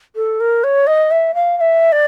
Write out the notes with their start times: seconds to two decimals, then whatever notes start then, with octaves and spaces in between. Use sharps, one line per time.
0.16 A4
0.40 A#4
0.64 C#5
0.87 D#5
1.11 E5
1.34 F5
1.57 F5
1.61 E5
1.92 D5